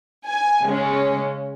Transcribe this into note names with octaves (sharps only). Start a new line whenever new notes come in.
G#5
C#3 G#3 C#4